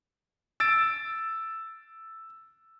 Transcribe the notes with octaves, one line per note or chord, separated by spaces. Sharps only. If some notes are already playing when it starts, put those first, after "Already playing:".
E6 A6 D7